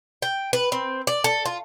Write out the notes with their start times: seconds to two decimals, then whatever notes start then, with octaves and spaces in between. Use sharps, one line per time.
0.22 G5
0.53 B4
0.72 C4
1.07 D5
1.24 A4
1.46 F4